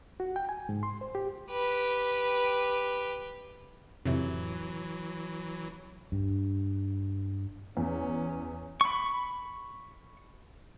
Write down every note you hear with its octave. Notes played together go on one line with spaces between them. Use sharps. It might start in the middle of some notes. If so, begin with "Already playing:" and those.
F#4
G5
G#5
G#2
C6
C5
G4
G4 B4
F2 A2 C3 E3 F#3
G2
E2 C#4
B5 C#6